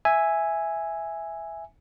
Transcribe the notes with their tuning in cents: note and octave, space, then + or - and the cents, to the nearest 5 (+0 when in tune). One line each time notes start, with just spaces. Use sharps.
E5 +0 G#5 +0